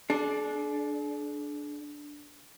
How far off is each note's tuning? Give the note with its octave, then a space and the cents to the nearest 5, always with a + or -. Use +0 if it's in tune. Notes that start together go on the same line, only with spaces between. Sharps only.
D4 +0 G#4 +45